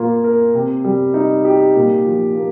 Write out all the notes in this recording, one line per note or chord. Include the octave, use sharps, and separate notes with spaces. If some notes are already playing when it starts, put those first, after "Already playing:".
Already playing: A#2 A#3 F4
A#4
C3
G3
D#4
G4
A#2
F3
A#3